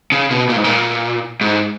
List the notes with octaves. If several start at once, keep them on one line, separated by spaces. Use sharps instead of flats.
C#3
B2
A#2
G#2
A#2
G#2